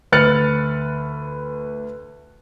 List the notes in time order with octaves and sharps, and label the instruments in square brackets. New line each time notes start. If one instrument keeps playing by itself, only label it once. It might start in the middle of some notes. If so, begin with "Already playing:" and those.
[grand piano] D2 B4 F6 A6 C#7 F#7